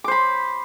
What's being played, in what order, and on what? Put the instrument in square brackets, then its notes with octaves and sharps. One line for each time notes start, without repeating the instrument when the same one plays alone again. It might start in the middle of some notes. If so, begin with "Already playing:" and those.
[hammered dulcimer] D6
C5
B5